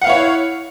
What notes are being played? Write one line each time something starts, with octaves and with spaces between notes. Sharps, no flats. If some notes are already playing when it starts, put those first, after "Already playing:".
E4 C#5 F5 F#5